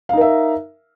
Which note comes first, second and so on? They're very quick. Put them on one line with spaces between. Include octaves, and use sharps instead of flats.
F5 D#4 A#4 E5